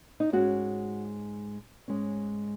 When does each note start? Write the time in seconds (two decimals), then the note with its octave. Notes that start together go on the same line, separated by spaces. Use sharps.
0.20 D#4
0.32 G#2 G#3 C#4 F#4
1.88 G#2 G#3 C#4